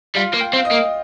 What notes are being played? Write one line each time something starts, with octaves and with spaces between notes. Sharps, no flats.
G3 F4
A#3
G5
C4
F5
D#5
A#3